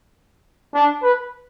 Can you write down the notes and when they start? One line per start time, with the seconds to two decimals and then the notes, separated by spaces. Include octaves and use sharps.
0.75 D4
1.03 B4